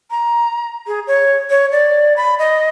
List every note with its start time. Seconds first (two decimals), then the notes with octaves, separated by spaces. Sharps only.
0.11 A#5
0.87 G#4
1.07 C#5
1.50 C#5
1.72 D5
2.17 B5
2.39 D#5